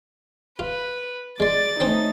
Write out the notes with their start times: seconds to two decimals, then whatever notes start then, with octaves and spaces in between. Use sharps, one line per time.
0.59 F4 B4
1.40 G#3 D5 C6 A6
1.80 A3 C4 C#4 D#4 C5